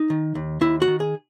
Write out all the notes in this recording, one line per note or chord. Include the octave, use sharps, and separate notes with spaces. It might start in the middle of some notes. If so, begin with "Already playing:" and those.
Already playing: D#4
D#3
D#2
D#2 E4
F#4
D#3
G#4